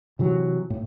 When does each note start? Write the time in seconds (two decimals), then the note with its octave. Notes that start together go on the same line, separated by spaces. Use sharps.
0.19 C3 E3 F#3
0.70 A2